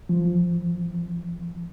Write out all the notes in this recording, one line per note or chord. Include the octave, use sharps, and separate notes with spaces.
F3